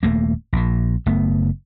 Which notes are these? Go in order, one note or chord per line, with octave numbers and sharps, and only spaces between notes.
D#1 A3 A#3
A#1 A#2
F#1 A3 B3